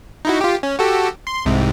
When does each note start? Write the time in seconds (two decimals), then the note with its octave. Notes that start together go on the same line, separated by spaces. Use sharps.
0.25 D#4 E4 F#4
0.41 F4 G4
0.63 C#4
0.79 F#4 G4 A4
1.27 C6
1.45 C2 G#2 C3